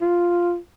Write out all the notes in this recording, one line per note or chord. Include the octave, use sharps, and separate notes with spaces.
F4